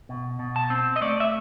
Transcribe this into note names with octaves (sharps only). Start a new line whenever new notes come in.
B2
B2
A5
C4
D#5
A3 D5
E5